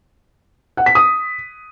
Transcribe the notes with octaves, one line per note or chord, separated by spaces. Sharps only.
F#5
B6
D#6